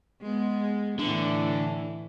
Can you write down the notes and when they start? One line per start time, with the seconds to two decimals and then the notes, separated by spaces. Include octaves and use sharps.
0.22 G#3 B3
0.99 A2 D3 E3